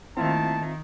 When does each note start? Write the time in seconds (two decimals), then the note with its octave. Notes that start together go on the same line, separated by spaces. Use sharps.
0.17 D#3 A3 A#3 C4 E4 F4 E5 A5